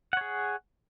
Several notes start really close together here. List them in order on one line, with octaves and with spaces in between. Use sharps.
F#5 C#5 G#4